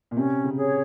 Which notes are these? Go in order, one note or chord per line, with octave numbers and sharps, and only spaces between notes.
A#2
C3 C#4
C#3
G#4 C#5